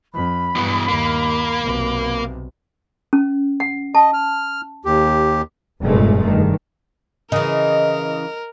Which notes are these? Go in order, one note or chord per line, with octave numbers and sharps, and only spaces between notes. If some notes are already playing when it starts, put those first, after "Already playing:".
F2 B5
G2 B2 E3
D#2 A#3
B1 C3
C#4
F#5
D#5 A5
F6
D#2 G4
F1 G2 A#2 G#3 A3
G2 D#3
C#3 E3 A#4 D#5